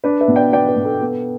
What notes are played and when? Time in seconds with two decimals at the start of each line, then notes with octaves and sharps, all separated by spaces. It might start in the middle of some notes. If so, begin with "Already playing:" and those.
0.04 D4 B4
0.20 B4 E5
0.28 B2
0.36 D5 G5
0.52 B3 D5 G5
0.69 B4
0.77 B2
0.85 A4
1.01 B3